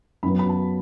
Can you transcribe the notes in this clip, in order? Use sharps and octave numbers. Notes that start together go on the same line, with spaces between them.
F#2 F#3 B3 B5
B5
A5